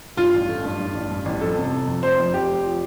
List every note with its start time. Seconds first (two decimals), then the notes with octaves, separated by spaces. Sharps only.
0.17 G2 F4
0.33 A1
0.48 A3
0.64 G2
0.79 G2
0.94 A1
1.10 G2
1.25 A1
1.40 F2 A4
1.56 C3
1.71 C3
1.87 F2
2.03 F1 C5
2.18 F2
2.34 F2 G4
2.49 F1
2.64 F3